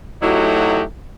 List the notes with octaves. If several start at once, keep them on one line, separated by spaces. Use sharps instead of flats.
F#3 A3 D#4 E4 F#4 G4